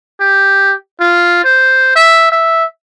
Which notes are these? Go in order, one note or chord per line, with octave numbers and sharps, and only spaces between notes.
G4
F4
C5
E5
E5